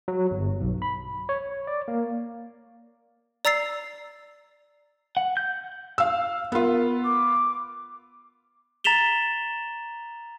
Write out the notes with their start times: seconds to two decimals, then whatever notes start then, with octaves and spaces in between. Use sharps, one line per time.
0.08 F#3
0.31 G1
0.61 B1
0.82 B5
1.29 C#5
1.67 D5
1.88 A#3
3.45 D5 A#5 E6 A6 C7
5.17 F#5
5.37 G6
5.98 F5 E6
6.52 B3 F4 A#4
7.04 D6
8.84 A#5 A6 B6 E7 F7 G7